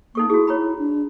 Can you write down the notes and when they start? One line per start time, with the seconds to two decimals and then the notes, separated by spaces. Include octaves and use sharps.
0.15 A#3 D#4 A4 C#6
0.30 E4 F#4 G#4
0.47 C#5 A#5 B5
0.79 D4